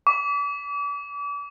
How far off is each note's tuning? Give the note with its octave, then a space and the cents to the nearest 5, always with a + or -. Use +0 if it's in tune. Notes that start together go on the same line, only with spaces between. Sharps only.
D6 -40